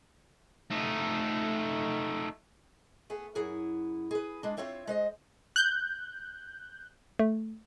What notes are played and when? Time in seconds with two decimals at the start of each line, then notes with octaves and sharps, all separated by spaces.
0.71 A3 D#4
3.10 A3 B3 G#4
3.35 F#2 E4 G#4 F#5
4.11 G#4 B4
4.43 G#3 D4
4.57 C4 F4 C#5 E5 G5
4.87 G#3 C5 D#5
5.56 F#6 G6
7.19 A3